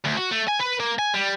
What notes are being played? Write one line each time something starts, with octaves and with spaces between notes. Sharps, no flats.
D2
F#4
A3
G#5
B4
A#3
G#5
G3